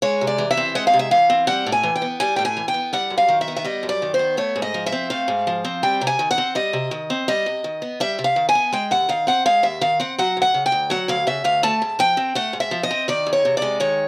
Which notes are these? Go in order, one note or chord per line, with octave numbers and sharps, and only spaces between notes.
G#3 C#5
C3
D5
E3
E5
C4
G#3 F#5
F5
C3
E5
E3 F5
C4
G3 F#5
A2
G#5
E3
G5
B3
G3 G#5
A2 G5
G#5
E3
G5
B3
G3 F#5
F#2
F5
D#3
E5
B3
E5
G3 D#5
F#2
D5
D#3
C5
B3
A3 C#5
G#2
D#5
F3
E5
C4
A3 F5
G#2
F3
C4
G3 G5
C3
G#5
D#3
F#5
C4
G3 D#5
C3
D#3
C4
G3 D#5
C3
D#3
B3
G3 E5
C3
F5
D#3
G#5
B3
G#3 G5
D#2 F#5
D#3 F5
C4 F#5
G#3 F5
D#2 E5
D#3 F5
C4 F#5
F#3 F#5
D2 F#5
C#3
G5
D2
F#3 F#5
D2 F5
C#3 E5
D2 F5
A3 A5
G#2
F3 G5
C4
A3 F#5
G#2
E5
F3
D#5
C4
D#3 D5
E2
C#5
C3
G#3 D5
D#3 C#5